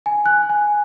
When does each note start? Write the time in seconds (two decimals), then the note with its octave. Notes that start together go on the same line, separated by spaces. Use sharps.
0.06 G#5
0.26 F#6
0.50 G#5